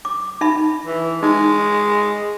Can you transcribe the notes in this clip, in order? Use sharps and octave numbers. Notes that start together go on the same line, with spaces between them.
D6
D#4 E5 B5
E3
G#3 D#4